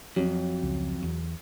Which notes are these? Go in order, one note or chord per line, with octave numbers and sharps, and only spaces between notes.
F2 F#3
C#2
E2